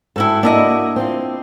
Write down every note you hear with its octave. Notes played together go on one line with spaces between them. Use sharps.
G#2 E4 F#4 G#4 A4 G5
A#3 D4 E4 F#4 D#5
C4 F4